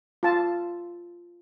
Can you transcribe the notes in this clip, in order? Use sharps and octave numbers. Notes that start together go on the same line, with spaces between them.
F4 A5